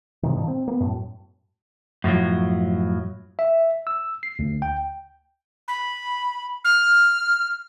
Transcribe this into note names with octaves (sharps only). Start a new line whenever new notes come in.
G#2 C3 D#3
G2 A#2 D#3
C4
A#3 B3
F#2 A2
F#2 A2 F3 F#3
E5
E6
C7
D2
G5
B5
F6